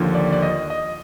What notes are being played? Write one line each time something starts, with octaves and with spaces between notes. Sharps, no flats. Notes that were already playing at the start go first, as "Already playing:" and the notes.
Already playing: D#2 D3 F3
D5
D5
D#5
D#5